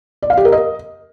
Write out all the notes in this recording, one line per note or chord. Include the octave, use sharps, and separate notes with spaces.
D5
F5
G4
A#4
D#5